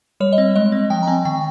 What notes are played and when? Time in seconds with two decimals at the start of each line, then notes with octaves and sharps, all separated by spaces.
0.20 G3 C#5
0.33 D#5
0.38 C4
0.55 G#3 D#5
0.72 C4
0.90 F3 G5
1.03 A#5
1.07 C4 G#5
1.25 D#3 G5